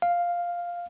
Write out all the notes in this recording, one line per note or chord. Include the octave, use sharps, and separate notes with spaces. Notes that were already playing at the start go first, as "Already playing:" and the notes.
F5